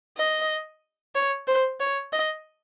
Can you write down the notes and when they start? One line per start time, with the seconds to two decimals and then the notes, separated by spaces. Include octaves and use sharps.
0.18 D#5
1.15 C#5
1.47 C5
1.80 C#5
2.13 D#5